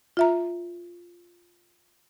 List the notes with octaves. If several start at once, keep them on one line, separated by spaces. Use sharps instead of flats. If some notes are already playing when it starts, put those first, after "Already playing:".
F4 E5 A#5